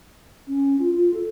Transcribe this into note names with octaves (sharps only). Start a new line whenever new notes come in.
C#4
F4
F4
A4